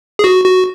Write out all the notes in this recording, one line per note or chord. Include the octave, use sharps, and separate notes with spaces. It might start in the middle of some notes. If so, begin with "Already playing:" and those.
G#4
F#4
F#4